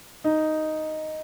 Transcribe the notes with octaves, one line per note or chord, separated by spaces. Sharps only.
D#4